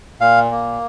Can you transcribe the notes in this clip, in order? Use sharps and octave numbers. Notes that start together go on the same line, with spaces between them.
A#2 F5
A#3